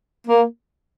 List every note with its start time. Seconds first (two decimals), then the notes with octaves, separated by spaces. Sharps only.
0.28 A#3